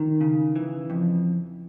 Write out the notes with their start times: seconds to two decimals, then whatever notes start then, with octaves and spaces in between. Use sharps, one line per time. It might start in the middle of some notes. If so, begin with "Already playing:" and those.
Already playing: D#3
0.21 C#3
0.56 E3
0.90 F2